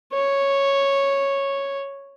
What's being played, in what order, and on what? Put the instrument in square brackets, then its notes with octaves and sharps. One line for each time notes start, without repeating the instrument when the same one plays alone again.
[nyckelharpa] C#5